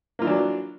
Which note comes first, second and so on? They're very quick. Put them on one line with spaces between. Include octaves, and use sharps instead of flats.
A#3 F4 E3 D4 F#3